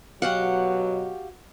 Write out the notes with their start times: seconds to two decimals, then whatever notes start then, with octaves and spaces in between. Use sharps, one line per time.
0.22 B2 F#3 F#4 G4 F5 F#5